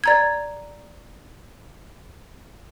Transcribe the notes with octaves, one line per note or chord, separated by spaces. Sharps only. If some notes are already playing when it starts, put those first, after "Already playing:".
D5 A#5 G#6